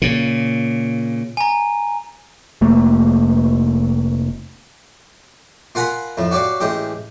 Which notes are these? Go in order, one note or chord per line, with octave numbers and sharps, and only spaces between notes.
A#2 C#3
G#5 A#5
F1 A3 A#3
F4 A#4 F#5 G#5 A#5 B5
F2 A2
F#4 G4 C#5 D5 F5
A1 G#3 G4 D#6